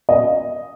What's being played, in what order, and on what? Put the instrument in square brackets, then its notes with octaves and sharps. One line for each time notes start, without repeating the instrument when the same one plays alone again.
[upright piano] D#5